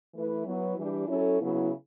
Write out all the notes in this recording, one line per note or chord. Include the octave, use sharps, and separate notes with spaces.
E3 A3 E4 B4
F#3 B3 E4
E3 G3 D4 G4
F#3 C#4 E4 A4
C#3 F#3 B3 E4